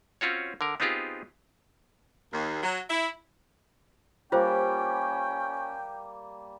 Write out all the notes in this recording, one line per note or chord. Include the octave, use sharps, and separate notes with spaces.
C4 C#4 F4 F#4 C#5
D3 A#4
B3 C4 D#4 F4 G4 G#4
D#2
F#3
E4
G3 A#3 C#4 F4 C5 G5